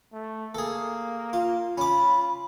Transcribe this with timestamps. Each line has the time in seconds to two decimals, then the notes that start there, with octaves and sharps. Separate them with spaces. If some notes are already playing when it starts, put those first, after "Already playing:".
0.13 A3
0.55 A#3 G#4 A4
1.33 F4
1.78 C#4 F4 B5 D6